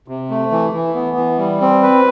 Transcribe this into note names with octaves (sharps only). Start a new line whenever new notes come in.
C3
A3
E3
E3
B3
E3
G3
C4
B4